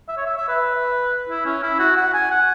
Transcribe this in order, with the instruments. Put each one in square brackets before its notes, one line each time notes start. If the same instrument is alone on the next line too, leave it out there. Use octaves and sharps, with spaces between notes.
[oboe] E5
C#5
E5
E5
B4
E4
C#4
E4
F#4
F#5
G#5
F#5